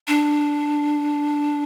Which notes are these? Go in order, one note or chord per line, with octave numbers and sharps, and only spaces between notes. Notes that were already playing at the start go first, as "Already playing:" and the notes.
D4